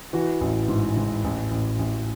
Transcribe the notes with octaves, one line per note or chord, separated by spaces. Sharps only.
E3 F#4
A1
G#2
G#2
A1
A1
A1